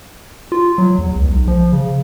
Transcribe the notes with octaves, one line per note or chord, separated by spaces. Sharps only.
F4
F#3
E2
C#2
B1
F3
C#3